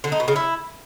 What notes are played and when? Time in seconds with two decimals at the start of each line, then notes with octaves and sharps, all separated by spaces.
0.04 D3
0.12 D#4
0.20 B2
0.28 C#3
0.36 E4